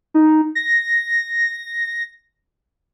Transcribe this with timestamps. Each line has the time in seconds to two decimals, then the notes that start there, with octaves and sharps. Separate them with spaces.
0.14 D#4
0.55 A#6